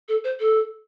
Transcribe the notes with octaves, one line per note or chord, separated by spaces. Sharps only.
A4
C5
A4